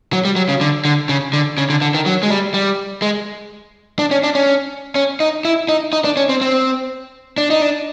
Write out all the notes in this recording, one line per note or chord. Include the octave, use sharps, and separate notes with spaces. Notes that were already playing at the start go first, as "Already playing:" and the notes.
F#3
G3
F#3
C#3
D3
D3
C#3
D3
C#3
D3
D3
D#3
F#3
G#3
G3
G3
G#3
D4
C#4
D4
C#4
C#4
D#4
E4
D#4
D#4
D4
C#4
C4
C4
D4
D#4
D4